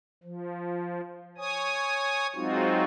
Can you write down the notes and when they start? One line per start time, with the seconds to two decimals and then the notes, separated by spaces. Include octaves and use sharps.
0.23 F3
1.37 C#5 G#5 D#6
2.35 F#3 G#3 C4 D#4 F4 F#4